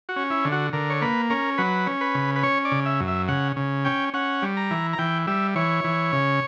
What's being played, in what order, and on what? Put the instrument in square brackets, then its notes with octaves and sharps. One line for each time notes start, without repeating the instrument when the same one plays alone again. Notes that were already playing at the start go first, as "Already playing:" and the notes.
[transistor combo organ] F#4
C#4
E4
D3
F#4
D3 A#4
C#5
A#3 B4
C#4 A#4
F#3 B4
C#4
B4
C#3
B4
C#4 C#5
D5
C#3
E5
F#2
E5
C#3 F#5
C#3
C#4 G5
C#4 F#5
G3
A#5
E3
A#5
E3 G5
G3 E5
E3 C#5
E3
C#3